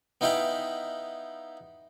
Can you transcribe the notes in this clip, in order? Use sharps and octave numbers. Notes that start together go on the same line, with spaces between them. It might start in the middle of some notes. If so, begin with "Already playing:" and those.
B3 D#4 E4 F5 G5 B5